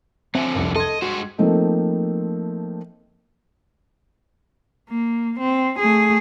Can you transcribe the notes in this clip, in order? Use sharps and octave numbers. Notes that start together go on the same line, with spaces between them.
D3 F3 F#3 C4 E5 G#5
F1 C2 F#2
A4 D#5 C6 G#6
G2 G#3 F#4 C5
F3 A3 A#3 C4 D#4
A#3
C4
A3 G#4